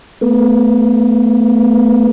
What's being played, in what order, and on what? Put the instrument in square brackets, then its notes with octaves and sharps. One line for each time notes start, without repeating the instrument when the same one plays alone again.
[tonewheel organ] A3 B3